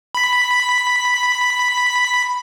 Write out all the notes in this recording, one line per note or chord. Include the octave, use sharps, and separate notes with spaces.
B5 B6